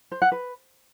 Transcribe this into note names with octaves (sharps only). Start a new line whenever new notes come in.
C5
F#5
B4